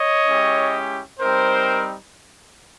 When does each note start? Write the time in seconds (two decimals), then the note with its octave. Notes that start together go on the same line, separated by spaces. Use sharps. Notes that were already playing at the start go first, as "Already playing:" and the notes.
Already playing: C#5 D#5
0.27 G#3 C#4 E4 G4
1.19 G3 C4 D#4 A#4 C5